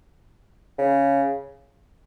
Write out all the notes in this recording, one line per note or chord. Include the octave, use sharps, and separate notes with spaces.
C#3